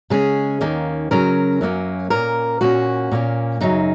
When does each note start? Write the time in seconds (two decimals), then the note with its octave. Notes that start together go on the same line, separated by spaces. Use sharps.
0.10 C#3 G#3 C#4 G#4
0.61 D#2 D#3 A#3 C#4
1.11 C#3 F#3 C#4 A#4
1.61 F#2 F#3 A#3 C#4
2.10 A#2 A#3 C#4 A#4
2.61 A#2 A#3 C#4 F#4
3.11 A#2 A#3 C#4
3.61 F#2 C#3 F#3 D#4